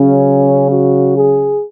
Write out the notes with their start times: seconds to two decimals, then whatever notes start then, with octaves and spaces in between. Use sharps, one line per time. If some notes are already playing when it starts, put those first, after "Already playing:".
Already playing: C#3 F#3 C#4
0.70 F#4
1.15 G#4